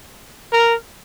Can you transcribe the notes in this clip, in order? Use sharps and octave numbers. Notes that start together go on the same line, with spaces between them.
A#4